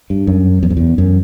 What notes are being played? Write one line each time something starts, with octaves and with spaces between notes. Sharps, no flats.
G2
F#2
E2
F2
E2
F#2